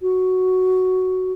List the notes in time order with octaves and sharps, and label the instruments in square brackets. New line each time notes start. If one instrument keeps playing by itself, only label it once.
[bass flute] F#4